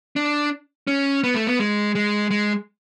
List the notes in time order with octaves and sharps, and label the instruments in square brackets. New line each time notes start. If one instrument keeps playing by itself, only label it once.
[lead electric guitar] D4
C#4
B3
A3
B3
G#3
G#3
G#3